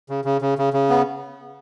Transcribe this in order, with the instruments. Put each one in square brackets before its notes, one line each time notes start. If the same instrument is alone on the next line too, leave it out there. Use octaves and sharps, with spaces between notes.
[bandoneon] C#3
C#3
C#3
C#3
C#3
B3